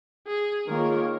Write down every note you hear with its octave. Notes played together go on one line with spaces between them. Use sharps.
G#4
D#3 A#3 F4 G#4 A#4 C#5